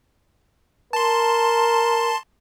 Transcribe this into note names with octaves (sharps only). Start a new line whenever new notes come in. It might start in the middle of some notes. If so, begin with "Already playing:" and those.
A#4 A5 C6